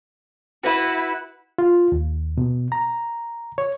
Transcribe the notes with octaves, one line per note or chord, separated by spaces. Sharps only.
E4 F#4 B4
F4
D#2
B2
A#5
C#5